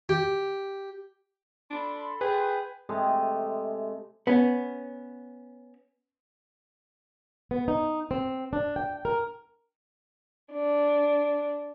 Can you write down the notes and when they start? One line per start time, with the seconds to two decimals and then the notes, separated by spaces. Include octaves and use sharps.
0.09 G4
1.70 D4 A4 B5 C6
2.21 G#4 B4 G5
2.89 C3 G#3 A3 D#5
4.27 B3 C#4
7.51 B3
7.68 D#4
8.11 C4
8.53 D4
8.76 G5
9.05 A#4
10.50 D4